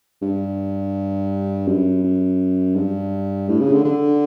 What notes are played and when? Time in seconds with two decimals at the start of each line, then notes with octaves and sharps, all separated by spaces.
0.22 G2
1.68 F#2
2.04 F#2
2.76 G2
3.49 A2
3.61 C#3
3.73 D3
3.85 D3